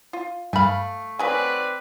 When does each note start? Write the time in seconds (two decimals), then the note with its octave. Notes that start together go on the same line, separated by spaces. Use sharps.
0.13 F4
0.53 G2 A3 F5 G#5 B5
1.19 D#3 F#3 C4 B4 D5 G#5